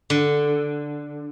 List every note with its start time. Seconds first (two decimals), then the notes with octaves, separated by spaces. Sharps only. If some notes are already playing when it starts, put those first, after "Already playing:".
0.10 D3